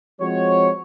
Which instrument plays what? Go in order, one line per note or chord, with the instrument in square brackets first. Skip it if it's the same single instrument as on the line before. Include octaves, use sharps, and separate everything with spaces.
[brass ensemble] F3 G#3 C4 F#4 C#5